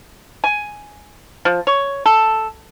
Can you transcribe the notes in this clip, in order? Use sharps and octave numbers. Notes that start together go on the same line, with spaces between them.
G#5
F3
C#5
A4